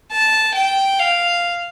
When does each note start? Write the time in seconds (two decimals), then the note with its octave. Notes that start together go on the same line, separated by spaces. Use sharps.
0.12 A5
0.55 G5
1.00 F5